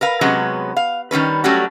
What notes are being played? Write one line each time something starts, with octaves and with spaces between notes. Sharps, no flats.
A#4 B4 F5
C3 F#3 G#3 B3 C#4 B4
F5
D#3 G3 C#4 B4
F#3 G3 A3 C#4 F#4 G4